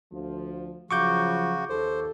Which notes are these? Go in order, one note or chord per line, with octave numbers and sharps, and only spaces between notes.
D2 F3
C#3 F3 F#3 F#4 C#6 D6 G6
D#2 A4 C5